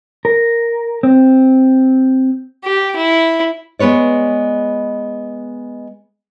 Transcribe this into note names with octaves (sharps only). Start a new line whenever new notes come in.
A#4
C4
G4
E4
G#3 B3 B4 C#5 D5